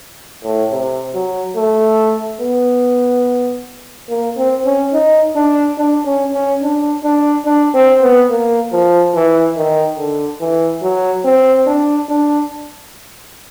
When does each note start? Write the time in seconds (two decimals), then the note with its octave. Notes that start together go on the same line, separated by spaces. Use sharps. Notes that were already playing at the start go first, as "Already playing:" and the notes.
0.44 A2
0.72 C3
1.14 F#3
1.56 A3
2.41 B3
4.09 A#3
4.37 C4
4.65 C#4
4.93 D#4
5.36 D4
5.78 D4
6.05 C#4
6.33 C#4
6.62 D4
7.04 D4
7.46 D4
7.74 C4
8.02 B3
8.30 A#3
8.72 F3
9.15 E3
9.56 D#3
9.98 D3
10.41 E3
10.82 F#3
11.25 C4
11.67 D4
12.09 D4